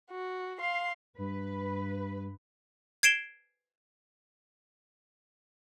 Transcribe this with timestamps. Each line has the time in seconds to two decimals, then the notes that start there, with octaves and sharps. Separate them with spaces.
0.11 F#4
0.60 F5 C6
1.18 G2 B4
3.03 G#6 C7 D7 E7 G7